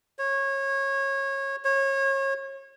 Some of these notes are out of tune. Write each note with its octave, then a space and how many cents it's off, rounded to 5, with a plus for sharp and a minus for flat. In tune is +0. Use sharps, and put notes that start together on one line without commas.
C#5 -25
C#5 -30